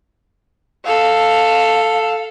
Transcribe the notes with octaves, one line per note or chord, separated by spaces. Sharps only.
A4 F5